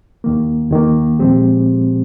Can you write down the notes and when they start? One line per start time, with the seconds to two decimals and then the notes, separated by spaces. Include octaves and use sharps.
0.24 D#2 D#3 A#3
0.71 D#2 D#3 A#3
1.19 A#2 F3 G#3 C4 G4